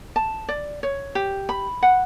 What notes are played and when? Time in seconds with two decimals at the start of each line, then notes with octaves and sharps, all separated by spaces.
0.16 A5
0.49 D5
0.83 C#5
1.15 G4
1.49 B5
1.83 F#5